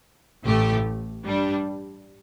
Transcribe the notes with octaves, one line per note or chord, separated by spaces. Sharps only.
A1 A2 A3 G4
G2 G3 D4